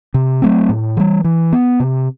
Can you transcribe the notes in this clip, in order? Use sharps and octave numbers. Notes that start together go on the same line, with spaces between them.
C3
F#3 A3 C4
A2
E3 G3
E3
B3
C3